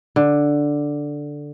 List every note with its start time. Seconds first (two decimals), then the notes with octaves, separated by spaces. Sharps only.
0.16 D3